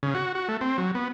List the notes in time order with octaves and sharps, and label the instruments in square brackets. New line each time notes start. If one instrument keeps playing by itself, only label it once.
[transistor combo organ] C#3
F#4
F#4
A3
C4
F#3
B3